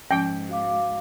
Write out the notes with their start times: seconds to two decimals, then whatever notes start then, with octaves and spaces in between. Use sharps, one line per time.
0.11 G#2 F3 C#4 G5
0.49 F#4 F5 D6